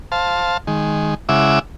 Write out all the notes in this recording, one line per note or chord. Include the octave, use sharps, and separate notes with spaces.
C5 F5 A5
D#3 G#3
C#3 G#3 E4 E5 F#5 D6